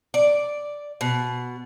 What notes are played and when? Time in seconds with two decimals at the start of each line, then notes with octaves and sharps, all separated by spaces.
0.14 D5
1.01 B2